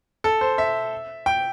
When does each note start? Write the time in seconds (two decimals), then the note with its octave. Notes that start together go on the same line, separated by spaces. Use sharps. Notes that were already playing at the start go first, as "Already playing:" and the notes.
0.24 A4
0.41 C5
0.58 E5
1.26 G5